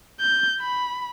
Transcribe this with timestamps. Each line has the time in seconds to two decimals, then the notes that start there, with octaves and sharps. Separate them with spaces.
0.20 G6
0.60 B5